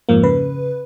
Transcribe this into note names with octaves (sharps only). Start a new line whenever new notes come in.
F2 G#2 F3 A#3
C#3 B4